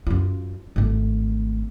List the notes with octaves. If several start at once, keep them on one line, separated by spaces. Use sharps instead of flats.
F#2 F4
G#1 A3